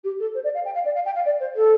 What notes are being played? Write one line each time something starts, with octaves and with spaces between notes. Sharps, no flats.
G4
A4
C5
D5
F5
G5
F5
D5
F5
G5
F5
D5
C5
A4